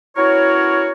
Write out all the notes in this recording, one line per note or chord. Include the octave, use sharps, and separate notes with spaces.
B3 C#4 E4 F#4 A#4 C#5